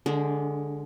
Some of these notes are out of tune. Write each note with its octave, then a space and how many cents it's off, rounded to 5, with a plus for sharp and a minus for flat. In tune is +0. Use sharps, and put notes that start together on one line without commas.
D3 +0 G#3 +0 D4 -45